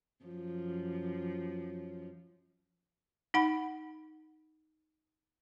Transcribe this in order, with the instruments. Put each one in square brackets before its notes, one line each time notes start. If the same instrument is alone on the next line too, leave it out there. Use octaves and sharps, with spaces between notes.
[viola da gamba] F#2 F3
[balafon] D#4 F#5 B5